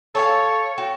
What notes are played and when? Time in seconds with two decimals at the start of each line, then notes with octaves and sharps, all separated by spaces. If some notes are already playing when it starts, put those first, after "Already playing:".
0.15 A4 C#5 F5 G#5 A5
0.78 F#4 G5